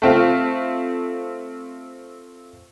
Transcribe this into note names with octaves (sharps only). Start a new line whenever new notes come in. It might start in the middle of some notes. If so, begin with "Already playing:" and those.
A3 C4 F4